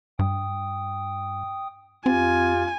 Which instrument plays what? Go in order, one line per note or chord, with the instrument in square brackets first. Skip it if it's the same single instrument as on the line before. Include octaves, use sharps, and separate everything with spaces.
[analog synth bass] G2 [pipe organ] G5 D#6
[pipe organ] F2 G4 A6 [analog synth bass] C4 [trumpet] F4 [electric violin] G#5